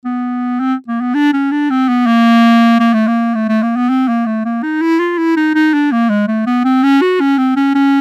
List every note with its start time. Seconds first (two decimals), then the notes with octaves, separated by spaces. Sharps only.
0.05 B3
0.60 C4
0.88 A#3
1.01 B3
1.15 D4
1.33 C#4
1.51 D4
1.70 C4
1.88 B3
2.07 A#3
2.80 A#3
2.94 A3
3.07 A#3
3.35 A3
3.49 A3
3.63 A#3
3.76 B3
3.89 C4
4.08 A#3
4.26 A3
4.45 A#3
4.63 D#4
4.82 E4
5.00 F4
5.18 E4
5.37 D#4
5.55 D#4
5.74 D4
5.92 A#3
6.10 G#3
6.28 A3
6.46 B3
6.65 C4
6.83 C#4
7.02 F#4
7.20 C#4
7.38 C4
7.56 C#4
7.75 C#4